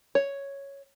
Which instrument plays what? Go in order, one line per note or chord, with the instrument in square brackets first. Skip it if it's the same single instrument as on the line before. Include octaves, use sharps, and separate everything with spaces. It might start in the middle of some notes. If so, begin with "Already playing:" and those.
[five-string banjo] C#5